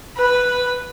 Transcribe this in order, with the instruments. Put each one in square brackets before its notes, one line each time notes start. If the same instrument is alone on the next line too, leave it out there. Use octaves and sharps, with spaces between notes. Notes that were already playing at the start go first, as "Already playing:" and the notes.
[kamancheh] B4 B5